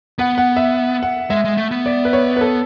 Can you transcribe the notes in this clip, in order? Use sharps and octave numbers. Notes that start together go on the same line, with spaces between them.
B3 F#5
F#5
E5
F#5
G#3 E5
G#3
A3
B3
D5
B4
C#5
B4
A4